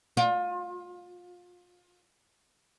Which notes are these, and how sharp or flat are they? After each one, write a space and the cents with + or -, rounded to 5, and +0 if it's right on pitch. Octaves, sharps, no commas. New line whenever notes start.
F4 +30